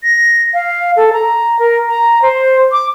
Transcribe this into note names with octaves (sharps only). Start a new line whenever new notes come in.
A#6
F5
A4
A#5
A#4
A#5
C5
D6